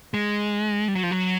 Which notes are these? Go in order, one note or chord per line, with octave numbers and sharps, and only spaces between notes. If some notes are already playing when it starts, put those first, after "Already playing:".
G#3
G3
F#3
F3
F#3